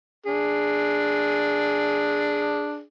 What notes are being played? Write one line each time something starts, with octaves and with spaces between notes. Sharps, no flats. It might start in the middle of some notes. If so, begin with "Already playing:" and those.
D4 G#4